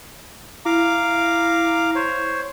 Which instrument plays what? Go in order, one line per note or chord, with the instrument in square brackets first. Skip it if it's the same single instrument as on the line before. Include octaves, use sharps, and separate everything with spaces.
[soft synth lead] E4 [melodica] F5 A#5 D6
[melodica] C5 C#5